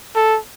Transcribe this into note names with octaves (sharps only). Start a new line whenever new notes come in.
A4